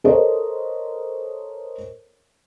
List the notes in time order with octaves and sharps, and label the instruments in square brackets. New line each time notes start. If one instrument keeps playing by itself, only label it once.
[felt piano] A4 A#4 C5 C#5 D#5